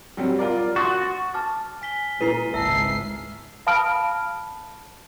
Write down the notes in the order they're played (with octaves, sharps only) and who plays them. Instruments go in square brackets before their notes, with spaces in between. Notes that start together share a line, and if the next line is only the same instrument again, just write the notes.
[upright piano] F#3 G3 C4
F4 A#4 D5
[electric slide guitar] F#4 [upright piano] C6 D#6 A6
[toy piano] A5 D6 [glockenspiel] F6 A6
[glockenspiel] G#5 B6 G7
[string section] A#2 [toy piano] E4 A4 B4 [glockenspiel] A#5 C7 D#7
[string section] G#1 C#2 C7 [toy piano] E5 A5 [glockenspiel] E6
[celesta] F5 A5 B5 D#6 F6 D7